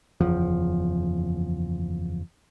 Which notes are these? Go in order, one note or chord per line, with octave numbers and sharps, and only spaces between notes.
F#1 E2 F3